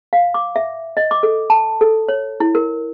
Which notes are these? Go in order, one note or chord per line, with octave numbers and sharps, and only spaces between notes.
F5
D6
E5
D#5
D6
A4
A5
A4
C#5
E4
A#4